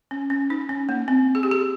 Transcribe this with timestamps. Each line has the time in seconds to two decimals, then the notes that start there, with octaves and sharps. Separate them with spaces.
0.11 C#4
0.30 C#4
0.50 D#4
0.69 C#4
0.89 A#3
1.08 C4
1.35 G#4
1.43 G4
1.51 G#4